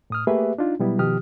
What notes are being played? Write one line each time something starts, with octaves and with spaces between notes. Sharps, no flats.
A2 D#6 F6
A3 A#3 G4 G#4 B4 E5
D4 D#4 F4
B2 F#3 G3 B3 E4
B2 D#3 F3 G4 D#6 F6